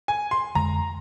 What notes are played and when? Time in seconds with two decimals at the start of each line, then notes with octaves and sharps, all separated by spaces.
0.08 G#5
0.31 C6
0.55 F2 D3 G#3 A#5